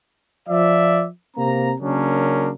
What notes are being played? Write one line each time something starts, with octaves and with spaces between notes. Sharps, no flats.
F3 D5 E5
C3 A#3 C4 A#5
C#3 F#3 A#3 C#4 D4 A#4